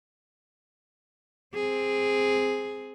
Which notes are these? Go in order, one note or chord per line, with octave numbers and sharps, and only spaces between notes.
C4 G#4